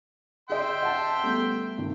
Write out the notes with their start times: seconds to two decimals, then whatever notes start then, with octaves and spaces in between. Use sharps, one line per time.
0.50 G#4 D#5 E5 G5 C6
0.83 F#5 A5
1.23 G3 A3 B3
1.78 G2 C3 D#3